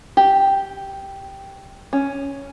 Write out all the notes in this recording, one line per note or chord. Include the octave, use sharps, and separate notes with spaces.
G4
C#4